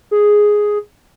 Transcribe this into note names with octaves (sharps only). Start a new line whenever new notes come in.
G#4